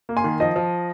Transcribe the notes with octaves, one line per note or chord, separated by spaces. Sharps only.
A#3
G#5 C6
D#3
F3 D#5
F3